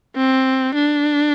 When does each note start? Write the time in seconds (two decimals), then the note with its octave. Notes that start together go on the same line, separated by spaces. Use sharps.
0.16 C4
0.75 D4